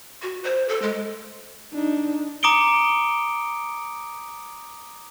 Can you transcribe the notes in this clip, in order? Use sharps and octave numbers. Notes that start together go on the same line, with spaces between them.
F#4
C5
A4
G#3
D4 D#4
A#5 D6 D#6 C#7 D7 G7